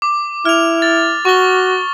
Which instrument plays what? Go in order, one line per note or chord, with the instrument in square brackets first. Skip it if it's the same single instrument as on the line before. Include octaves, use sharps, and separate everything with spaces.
[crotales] D6
[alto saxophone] E4 [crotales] F6 F7
[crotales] A6
[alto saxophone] F#4 [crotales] C#6 G7